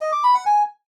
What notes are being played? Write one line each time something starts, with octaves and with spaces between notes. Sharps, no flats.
D#5
D6
B5
F#5
G#5